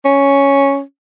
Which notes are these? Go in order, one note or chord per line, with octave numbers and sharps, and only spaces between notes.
C#4